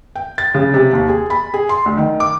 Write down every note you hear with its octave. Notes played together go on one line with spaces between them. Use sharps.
G5
A6
C#3
C3
D#2
G#4
B5
G#4
C6
D2
D#3
D6